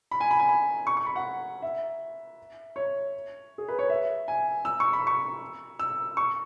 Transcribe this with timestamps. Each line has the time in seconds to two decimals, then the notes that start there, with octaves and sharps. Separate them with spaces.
0.11 B5
0.20 G#5
0.31 B5
0.39 G#5
0.49 B5
0.87 C#6
0.97 C#6
1.06 B5
1.16 F#5
1.62 E5
2.76 C#5
3.58 G#4
3.68 B4
3.79 C#5
3.90 E5
4.28 G#5
4.65 E6
4.80 C#6
4.93 B5
5.07 C#6
5.79 E6
6.17 C#6